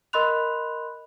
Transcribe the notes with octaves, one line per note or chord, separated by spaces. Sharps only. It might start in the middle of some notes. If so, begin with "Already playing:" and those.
A#4 D#5 B5 C6 F#6 F7